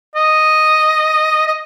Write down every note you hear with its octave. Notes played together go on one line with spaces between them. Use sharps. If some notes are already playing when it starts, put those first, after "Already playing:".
D#5
D#5